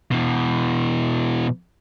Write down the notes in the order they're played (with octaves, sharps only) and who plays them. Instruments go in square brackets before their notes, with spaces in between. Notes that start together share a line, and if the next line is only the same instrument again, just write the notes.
[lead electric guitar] B2 E3